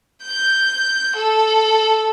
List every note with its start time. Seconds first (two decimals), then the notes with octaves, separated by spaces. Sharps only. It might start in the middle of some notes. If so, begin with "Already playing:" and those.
0.23 G6
1.16 A4